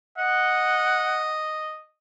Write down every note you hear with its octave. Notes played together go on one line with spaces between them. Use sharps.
D#5 F#5